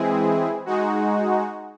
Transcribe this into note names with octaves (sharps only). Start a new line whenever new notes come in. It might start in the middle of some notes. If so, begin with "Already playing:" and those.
Already playing: E3 G#3 C4 E4 G#4
G#3 D#4 F#4